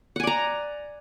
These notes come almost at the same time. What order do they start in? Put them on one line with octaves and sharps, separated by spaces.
F#5 G#5 D5 A#5